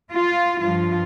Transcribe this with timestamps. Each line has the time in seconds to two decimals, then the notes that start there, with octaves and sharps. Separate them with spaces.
0.13 F4
0.60 G2 F3 F4